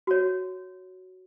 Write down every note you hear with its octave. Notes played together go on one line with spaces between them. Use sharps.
F#4 C#5